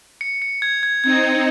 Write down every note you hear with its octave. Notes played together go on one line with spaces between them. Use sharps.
C#7
C#7
G#6
G#6
C4 D#4 G#6
G#6